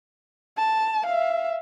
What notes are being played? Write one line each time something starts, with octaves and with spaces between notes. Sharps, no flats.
A5
E5 F5